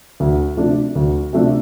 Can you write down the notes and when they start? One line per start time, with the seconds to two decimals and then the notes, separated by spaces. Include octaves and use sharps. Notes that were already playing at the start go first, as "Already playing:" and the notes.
0.20 D2
0.57 C3 F3 A3 D4
0.95 D2
1.33 C3 F3 A3 D4